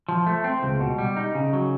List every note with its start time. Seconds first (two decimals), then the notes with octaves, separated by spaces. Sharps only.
0.09 F3
0.26 A3
0.44 C4
0.63 C#2
0.80 B2
0.98 G3
1.17 D#4
1.35 C#3
1.53 F#3